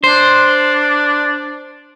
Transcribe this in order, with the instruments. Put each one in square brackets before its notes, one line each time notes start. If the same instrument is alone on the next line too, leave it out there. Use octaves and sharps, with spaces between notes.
[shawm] D4 [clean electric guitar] C5